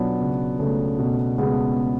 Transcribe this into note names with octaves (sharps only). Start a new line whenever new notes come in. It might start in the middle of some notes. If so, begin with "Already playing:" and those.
Already playing: B2 F#3 B3 C#4 D4 F4
C#2
C#2 A3 C#4
B2
C#2 G#3 B3